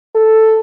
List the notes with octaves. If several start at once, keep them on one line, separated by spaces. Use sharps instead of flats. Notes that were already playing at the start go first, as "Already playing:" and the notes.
A4